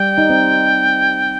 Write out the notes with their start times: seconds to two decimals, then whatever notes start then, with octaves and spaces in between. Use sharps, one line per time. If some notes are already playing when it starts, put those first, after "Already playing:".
Already playing: G3 G5
0.18 D#4
0.30 C4